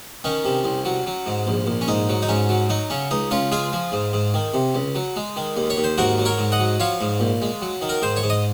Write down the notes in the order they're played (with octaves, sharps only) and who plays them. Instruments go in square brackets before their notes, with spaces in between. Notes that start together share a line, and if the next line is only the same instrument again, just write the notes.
[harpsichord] D#3 C#4
C3
C2
F#3
F#3
G#2
A#1
A#1
C#4
G#2 D#4
F#3
D#4
G#2 C#4
F#3
F#3 D#4
C#3 C#4
C#2 D#4
C#2 C#4 F4
G#3 F4 G#4
F3
G#2
G#2
D#3
C3
C#2
F#3
G#3
D#3
D#2
C#5
D#2
C5
G#2 F#4 A#4
F#3
A#4 C#5
G#2
D#5 F#5
F#3
F3 C#5 F5
G#2
A#1
G#3
F#3
D#3
A#4
G#2 C5
C#5
G#2
D#5